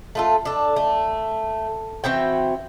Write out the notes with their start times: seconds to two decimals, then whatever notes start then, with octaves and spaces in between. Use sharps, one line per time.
0.15 A3 F4 A4
0.45 D4 A4
0.76 A3
2.04 E3 C4 F#4 G5